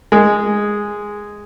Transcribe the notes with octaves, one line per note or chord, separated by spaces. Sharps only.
G#3